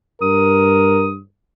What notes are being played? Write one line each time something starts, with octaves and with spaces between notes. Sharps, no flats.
G2 A#4 D#6